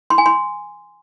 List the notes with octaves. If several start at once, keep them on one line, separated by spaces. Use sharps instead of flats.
C6
G#5
C6